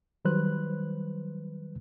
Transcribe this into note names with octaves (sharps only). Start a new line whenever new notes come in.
D#3 F#3 G3 B4 C5 F#6